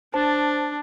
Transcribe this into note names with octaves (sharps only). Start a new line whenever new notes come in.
D4 C5 A5 A6